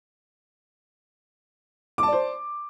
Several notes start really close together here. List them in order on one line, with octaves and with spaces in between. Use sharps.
D6 A5 D5 C5